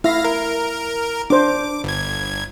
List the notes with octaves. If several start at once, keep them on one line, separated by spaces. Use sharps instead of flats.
E4 E5 F5 A#6
A#4
D4 C5 D6
G1 G#6